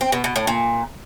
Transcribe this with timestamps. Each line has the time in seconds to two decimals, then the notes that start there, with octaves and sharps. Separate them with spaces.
0.01 C4
0.12 B2
0.24 B2
0.36 A2
0.47 A#2